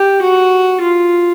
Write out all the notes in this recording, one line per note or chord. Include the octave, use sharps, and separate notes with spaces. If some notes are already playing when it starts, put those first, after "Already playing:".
Already playing: G4
F#4
F4